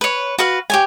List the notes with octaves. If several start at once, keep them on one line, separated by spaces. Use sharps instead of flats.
B4 C#5
F#4 B4 F5
G4 C#5 G#5